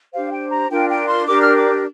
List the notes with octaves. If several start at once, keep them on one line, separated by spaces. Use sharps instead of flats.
D4 G4 C5 F5
G5
A#5
D4 F4 A#4 G5
G5
C6
D4 G4 A#4 D6
F6
D6